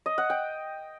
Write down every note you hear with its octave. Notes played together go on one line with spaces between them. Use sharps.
D#5
F#5
G5